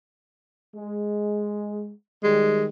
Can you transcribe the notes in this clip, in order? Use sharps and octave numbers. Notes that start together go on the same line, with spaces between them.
G#3
D#3 G3 G#3